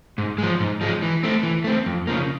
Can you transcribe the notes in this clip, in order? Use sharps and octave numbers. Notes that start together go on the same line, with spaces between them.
G#2
F3 G#3
G#2
F3 G#3
E3
A3 C4
E3
A3 C4
F2
C#3 F3 A#3